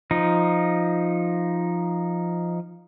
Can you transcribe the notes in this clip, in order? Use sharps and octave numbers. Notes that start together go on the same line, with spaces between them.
F3 D#4